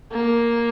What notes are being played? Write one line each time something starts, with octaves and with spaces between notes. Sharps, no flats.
A#3